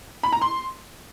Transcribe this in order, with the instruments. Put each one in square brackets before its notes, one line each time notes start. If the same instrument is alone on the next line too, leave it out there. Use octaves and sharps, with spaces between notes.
[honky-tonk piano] B5
A#5
C6